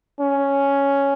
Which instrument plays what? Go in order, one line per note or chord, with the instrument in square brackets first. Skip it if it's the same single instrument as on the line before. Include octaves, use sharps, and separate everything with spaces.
[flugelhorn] C#4